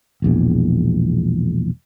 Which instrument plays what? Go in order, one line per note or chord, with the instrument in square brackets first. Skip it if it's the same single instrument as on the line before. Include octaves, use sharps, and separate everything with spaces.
[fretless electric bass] E1 A#1 E2